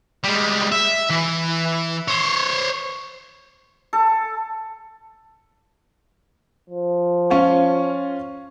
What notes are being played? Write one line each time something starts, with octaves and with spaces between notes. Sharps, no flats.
G3 G#3
E5
E3
C5 C#5
A4
F3
C#4 F4 C#5